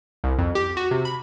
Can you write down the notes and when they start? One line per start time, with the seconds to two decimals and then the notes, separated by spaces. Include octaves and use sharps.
0.24 C2
0.38 F2
0.55 G4
0.77 F#4
0.91 C3
1.05 B5